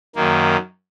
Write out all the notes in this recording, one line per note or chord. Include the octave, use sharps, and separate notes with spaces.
F#2 D#3 A#3